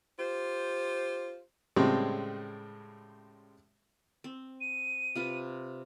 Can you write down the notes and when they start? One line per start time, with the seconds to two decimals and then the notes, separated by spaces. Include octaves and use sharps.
0.19 F4 G4 C5
1.76 A2 C#3 G3 G#3 C4
4.24 C4
4.61 D#7
5.15 C3 F4 B4